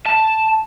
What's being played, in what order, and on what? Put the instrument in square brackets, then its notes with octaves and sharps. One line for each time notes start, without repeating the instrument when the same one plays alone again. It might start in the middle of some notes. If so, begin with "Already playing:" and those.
[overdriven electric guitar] A5